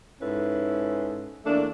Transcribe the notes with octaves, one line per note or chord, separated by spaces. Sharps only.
G#2 C#4 E4 A4 B4
E2 A3 A#3 D4